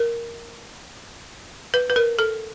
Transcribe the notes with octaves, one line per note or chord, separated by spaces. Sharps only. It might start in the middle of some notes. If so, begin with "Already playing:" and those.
Already playing: A#4
B4
B4
A#4
A4